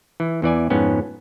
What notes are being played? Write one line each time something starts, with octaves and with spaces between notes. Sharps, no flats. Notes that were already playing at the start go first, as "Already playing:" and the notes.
E3
E2 E3 D5 G#5
F2 G#2 B3 C#4